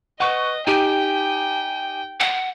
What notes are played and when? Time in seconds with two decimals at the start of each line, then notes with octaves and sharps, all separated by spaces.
0.20 B4 D#5 F#5 C#6
0.67 D#4 G4 G5 G#5 D7
2.20 F#5